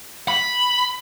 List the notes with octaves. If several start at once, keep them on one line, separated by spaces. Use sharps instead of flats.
B5